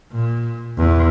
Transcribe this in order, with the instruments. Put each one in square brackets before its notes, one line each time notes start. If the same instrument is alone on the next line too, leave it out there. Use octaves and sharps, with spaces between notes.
[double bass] A#2
E2